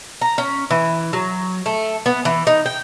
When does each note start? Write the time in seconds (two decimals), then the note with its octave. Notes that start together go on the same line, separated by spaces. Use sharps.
0.21 A#5
0.38 C#4
0.71 E3
1.13 F#3
1.66 A3
2.06 B3
2.25 E3
2.47 D#4
2.66 G5